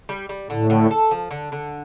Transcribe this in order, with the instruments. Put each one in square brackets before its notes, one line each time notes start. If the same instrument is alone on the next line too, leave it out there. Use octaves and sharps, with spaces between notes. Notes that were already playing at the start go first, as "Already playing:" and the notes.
[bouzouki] G3
G3
[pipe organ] A2 [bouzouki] D3
[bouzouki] D3
A4
F3
D3
D3